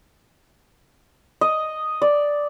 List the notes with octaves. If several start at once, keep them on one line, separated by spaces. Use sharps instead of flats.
D#5
D5